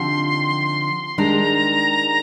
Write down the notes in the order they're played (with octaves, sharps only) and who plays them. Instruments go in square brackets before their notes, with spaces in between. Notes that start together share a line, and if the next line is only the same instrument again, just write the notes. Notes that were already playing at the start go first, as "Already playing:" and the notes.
Already playing: [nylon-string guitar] D3 F3 C4 D#4 G4 [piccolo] C6
[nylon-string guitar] D#3 G#3 D4 G4 [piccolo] A#5